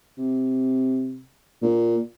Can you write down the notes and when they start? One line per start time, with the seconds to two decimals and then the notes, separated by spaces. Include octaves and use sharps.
0.18 C3
1.62 A#2